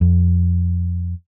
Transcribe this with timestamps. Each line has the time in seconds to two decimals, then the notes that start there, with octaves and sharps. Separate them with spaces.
0.01 F2